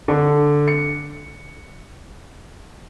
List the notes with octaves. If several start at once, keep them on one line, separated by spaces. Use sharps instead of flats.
D3
C#7